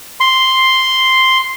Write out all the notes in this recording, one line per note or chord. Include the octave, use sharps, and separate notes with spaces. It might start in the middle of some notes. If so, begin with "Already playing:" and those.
C6